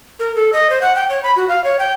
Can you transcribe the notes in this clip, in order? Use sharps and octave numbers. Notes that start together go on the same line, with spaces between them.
A#4
A4
D#5
C5
F#5
G5
C#5
B5
F#4
F5
C#5
G5